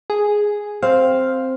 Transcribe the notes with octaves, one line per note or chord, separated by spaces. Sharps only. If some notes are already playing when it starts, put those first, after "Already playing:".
G#4
C4 F5